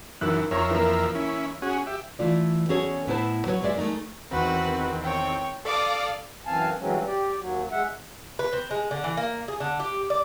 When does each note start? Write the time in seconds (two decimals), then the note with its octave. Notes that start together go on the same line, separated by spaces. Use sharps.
0.21 F#2 D#3 E3 E6 F#6
0.51 F2 A#4 C#5 E5 A#5 C#6
0.71 E3 A#3
1.15 C#4 E4
1.62 C#4 F#4 G#4
1.87 G4 E5
2.19 E3 A3 F4 D5
2.69 B3 C#4 F#4 G#4 A4 C#5
3.07 A2 B3 E4 B4 C5 A5
3.47 F#3 B4 C#5
3.62 F#2 G#3 G#4 D5 E5
3.77 G#3 A3 C4 D#4 A#4
4.31 E2 D#3 C4 F#4 B4
5.03 C#5 G5
5.65 A4 D5 F5 D6 D#6
6.47 F#2 E3 C4 F5 G#5 A5
6.80 G2 E3 F#3 G#3 C4 C#4
7.06 G4 D5
7.38 D#2 F#3
7.72 G#3 E5 F#5
8.39 B4
8.53 C4
8.71 G#3
8.91 D3
9.04 E3
9.17 A#3
9.48 G#4
9.60 D3
9.80 G4
10.10 D5